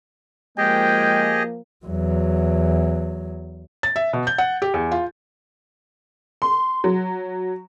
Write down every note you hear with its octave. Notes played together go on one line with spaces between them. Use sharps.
F3 G#3 A#3 G4 G#4 D#5 G5
E2 F#3
A6
E5
B2
G6
F#5
G4
E2
F4
C6
F#3